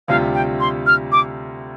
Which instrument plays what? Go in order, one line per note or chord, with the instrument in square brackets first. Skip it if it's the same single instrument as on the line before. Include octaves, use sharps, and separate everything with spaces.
[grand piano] D2 C3 G3 F4 [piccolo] F5
[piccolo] G5
C6
F6
D6